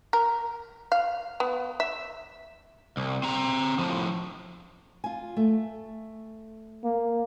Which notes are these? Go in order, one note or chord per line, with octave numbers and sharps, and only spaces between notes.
A#4
F5
B3
E5
C2
C4 A#5
A2 F3
F4 G#5
A3
A#3